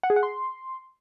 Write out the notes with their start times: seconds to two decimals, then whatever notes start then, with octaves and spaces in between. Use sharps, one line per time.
0.03 F#5
0.10 G#4
0.16 F#5
0.23 C6